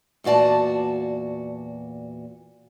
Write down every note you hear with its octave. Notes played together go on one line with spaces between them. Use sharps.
E2 A#2 F#4 D5 A5